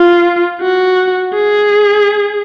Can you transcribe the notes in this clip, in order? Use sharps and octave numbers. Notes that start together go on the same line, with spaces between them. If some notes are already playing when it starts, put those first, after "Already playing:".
Already playing: F4
F#4
G#4